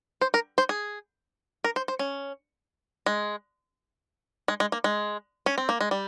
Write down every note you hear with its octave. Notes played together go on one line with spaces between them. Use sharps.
C5
A#4
C5
G#4
A#4
C5
C5
C#4
G#3
G#3
G#3
A#3
G#3
C#4
C4
A#3
G#3
G3